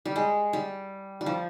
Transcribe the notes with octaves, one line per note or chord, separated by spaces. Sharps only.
G3
G#3
G3
G3
F3